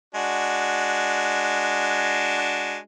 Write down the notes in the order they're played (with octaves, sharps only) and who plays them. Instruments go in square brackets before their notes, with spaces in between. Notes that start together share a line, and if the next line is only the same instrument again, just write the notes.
[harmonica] G#3 D4 F#4